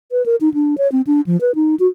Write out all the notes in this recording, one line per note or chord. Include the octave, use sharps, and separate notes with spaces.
B4
A#4
D#4
D4
C#5
C4
D4
F3
B4
D#4
F#4